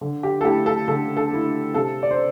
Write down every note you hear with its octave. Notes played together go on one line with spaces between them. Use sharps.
D3
G4
A4
A3 E4 G4
A4
D3 A4
A4
A3 E4
C3 A4
D5
C5